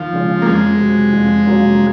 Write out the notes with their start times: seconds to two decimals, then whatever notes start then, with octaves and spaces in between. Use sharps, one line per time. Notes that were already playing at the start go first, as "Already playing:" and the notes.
Already playing: D#2 F3
0.13 C#3 G#3 C#4 F4
0.42 A#3
0.46 F2 G#3
0.80 C3 F#3
1.13 F2
1.46 C3 F#3 A#3 C#4